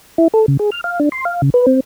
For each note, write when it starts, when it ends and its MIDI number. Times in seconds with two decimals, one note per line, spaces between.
0.18 0.28 64
0.34 0.46 69
0.48 0.57 49
0.59 0.70 68
0.72 0.81 89
0.84 1.00 77
1.00 1.09 62
1.12 1.25 84
1.25 1.42 77
1.42 1.50 49
1.54 1.66 71
1.67 1.80 60